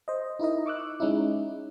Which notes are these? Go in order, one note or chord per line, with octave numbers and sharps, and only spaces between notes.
C5 D#5
D#4 E4 A#4 D#5
C#6 D6 E6 F#6
G#3 C#4 D#4 E4